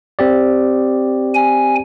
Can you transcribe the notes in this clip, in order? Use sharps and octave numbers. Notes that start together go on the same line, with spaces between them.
C4 G4 D5
G#5